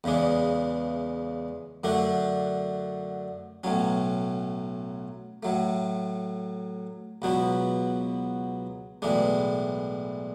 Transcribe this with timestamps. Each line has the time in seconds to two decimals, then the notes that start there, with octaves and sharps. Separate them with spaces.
0.04 E2 C#3 E3 G#3 D4
1.84 F#2 D3 A3 D4 F#4
3.64 B1 A2 F#3 C#4
5.43 A2 F#3 A3
7.22 C#2 B2 F#3 B3 F#4
9.02 B1 A2 E3 G#3 D4